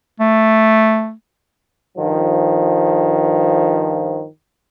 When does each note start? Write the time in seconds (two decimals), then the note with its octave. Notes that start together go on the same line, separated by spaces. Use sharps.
0.20 A3
1.98 G2 D#3 F3